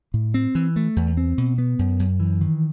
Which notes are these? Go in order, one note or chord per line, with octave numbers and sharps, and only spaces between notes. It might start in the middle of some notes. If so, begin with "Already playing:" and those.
A2
C4
E3
A3
E2
C4
B2
B3
F#2
F#2
E3
D#3